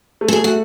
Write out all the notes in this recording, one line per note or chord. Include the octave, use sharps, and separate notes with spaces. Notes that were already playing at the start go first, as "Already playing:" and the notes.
A3
A4
G#4
A3
F#4